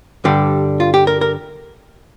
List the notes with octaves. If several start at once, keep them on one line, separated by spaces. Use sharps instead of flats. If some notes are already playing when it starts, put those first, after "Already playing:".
G2 D3 G3 G4
F4
G4
A#4
A#4